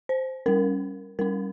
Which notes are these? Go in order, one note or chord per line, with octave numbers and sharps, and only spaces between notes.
C5
G3 C#4 A#4
G3 C#4 A#4